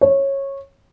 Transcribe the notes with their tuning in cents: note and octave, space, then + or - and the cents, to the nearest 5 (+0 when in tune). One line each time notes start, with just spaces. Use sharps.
C#5 -15